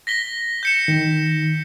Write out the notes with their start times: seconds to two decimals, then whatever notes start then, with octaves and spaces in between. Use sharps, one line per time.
0.07 A#6 B6 G7
0.63 G6 C#7 E7
0.88 D#3